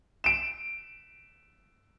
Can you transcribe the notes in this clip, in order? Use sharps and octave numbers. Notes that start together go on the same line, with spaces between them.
D7 E7